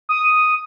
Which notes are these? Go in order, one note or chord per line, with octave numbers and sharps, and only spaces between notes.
D#6